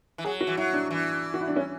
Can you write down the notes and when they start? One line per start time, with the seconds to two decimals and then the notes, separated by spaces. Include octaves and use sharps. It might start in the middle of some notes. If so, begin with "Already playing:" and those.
0.18 E3
0.25 F#3 G#4
0.41 F#4
0.47 E3
0.57 F#3 E4
0.73 D4
0.91 E3
1.34 F#4
1.41 E4
1.48 D4
1.56 C#4